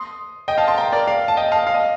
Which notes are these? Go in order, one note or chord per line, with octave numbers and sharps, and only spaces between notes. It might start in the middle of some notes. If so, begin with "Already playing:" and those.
Already playing: C6 D#6
D#5 G5
F5 A5
A5 C6
G5 A#5
A#4 D5
D5 F5
A5
D#5 G5
F5 A5
F5
D#5